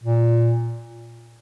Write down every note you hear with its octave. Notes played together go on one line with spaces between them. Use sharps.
A#2